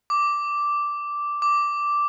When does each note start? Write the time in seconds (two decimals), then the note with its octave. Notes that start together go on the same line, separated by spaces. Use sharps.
0.10 D6
1.42 D6